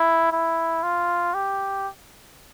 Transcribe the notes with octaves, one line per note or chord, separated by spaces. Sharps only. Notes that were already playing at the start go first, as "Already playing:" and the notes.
Already playing: E4
E4
F4
G4